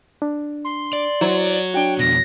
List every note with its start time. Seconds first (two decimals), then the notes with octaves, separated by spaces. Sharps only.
0.22 D4
0.64 C6
0.93 D5
1.21 F#3 E4 C5
1.74 D4 F#4 G5
1.99 F2 B2 A#6